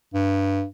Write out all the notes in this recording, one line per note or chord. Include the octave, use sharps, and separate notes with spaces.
G2